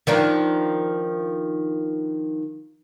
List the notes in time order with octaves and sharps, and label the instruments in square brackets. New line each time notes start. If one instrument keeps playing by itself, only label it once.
[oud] D#3 F3 D4